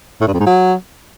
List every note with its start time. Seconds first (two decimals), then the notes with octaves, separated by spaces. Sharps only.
0.21 A2
0.27 G2
0.34 F2
0.40 G#2
0.47 F#3